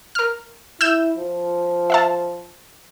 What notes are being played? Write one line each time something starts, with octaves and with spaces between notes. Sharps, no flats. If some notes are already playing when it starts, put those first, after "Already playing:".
A#4 F6
E4 E6 G6 E7
F3
E5 F5 A5